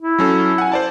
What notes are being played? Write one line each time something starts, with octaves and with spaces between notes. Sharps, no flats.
E4
F#3 C#4 A4
F#5 G#5
C5 D5 A5